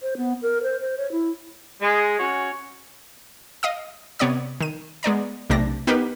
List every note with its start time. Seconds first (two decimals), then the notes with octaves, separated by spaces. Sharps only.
0.02 C5
0.17 B3
0.42 A#4
0.63 C5
0.80 C5
0.98 C#5
1.12 E4
1.81 G#3
2.19 C#4 F#4 C#5
3.63 D#5 F5 D#6
4.19 C3 B3 C#5 D5 D#6
4.60 D#3 D#7
5.03 G#3 B3 D5 A#5
5.50 B1 C3 A3 D4 A#6
5.87 B3 D#4 G4 A#4 B4